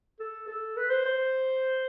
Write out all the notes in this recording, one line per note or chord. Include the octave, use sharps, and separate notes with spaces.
A4
A4
B4
C5
C5